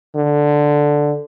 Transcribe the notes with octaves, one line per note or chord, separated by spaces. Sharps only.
D3